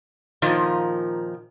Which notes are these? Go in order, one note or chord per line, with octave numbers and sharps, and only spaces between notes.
A#2 D#3 F3